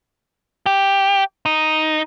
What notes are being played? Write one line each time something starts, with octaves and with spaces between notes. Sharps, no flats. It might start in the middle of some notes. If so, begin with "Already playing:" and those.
G4
D#4